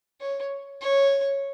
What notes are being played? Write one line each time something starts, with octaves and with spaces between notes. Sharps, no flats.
C#5
C#5